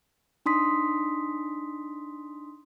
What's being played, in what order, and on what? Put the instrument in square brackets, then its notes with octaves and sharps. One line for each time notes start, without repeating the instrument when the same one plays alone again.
[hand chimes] D4 D#4 C6 D#6 B6